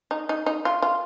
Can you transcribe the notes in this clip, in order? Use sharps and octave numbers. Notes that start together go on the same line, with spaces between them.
D#4
D#4
D#4
F4
F4